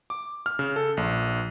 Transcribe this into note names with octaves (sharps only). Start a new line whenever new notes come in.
D6
F6
C#3
A4
A#1